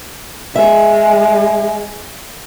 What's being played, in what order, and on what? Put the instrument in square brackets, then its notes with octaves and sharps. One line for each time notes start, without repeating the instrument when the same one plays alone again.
[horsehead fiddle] G#3 [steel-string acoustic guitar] E5